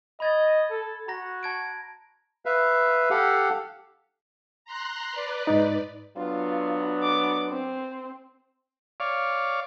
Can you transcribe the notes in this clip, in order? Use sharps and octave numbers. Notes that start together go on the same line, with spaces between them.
D#5 B5 G#6 A6
A4
F#4 A#5 A#6
A5 G#6 D7
B4 E5 F5
G4 A4 F5 F#5
A#5 C6 F#6
B4 D5
G#2 D#4
F#3 B3 D4 F4
D6
C4
C#5 D5 F5